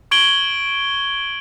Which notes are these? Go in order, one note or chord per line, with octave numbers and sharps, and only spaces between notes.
C#6 G#6 D7 F#7 G7